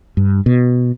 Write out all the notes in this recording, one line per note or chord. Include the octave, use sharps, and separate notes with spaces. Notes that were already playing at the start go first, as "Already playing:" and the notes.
G2
B2